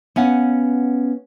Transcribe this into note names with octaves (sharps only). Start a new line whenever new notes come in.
B3 C#4 F5 F#5